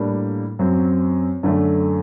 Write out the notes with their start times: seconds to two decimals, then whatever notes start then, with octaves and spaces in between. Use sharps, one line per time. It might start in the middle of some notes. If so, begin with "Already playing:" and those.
Already playing: A2 G3 A#3 D4
0.59 F#2 F#3 C4
1.43 F#2 D3 A3